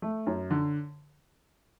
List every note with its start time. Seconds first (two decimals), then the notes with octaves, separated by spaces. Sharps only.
0.02 A3
0.27 F#2
0.51 D3